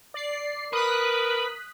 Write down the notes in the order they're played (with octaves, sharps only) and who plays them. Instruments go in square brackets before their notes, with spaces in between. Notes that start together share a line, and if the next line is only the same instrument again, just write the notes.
[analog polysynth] D5 C7
[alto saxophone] A#4 [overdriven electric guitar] B4 [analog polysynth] D#6 F#6 B6